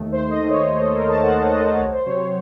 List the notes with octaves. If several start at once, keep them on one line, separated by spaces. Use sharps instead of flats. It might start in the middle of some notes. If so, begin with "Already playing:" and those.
Already playing: D#2 D#3 A3
D#2 C5
D#5
D#3 A3
C#5
D#2
A4
D#3 A3 A#4
A5
D#2 F#5
D#3 A3 D#5
C2 C#5
C5
C3 F#3 C4 C#5